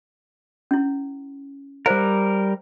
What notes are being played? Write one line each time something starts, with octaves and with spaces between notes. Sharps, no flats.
C#4 E4
G3 A#4 C5 F5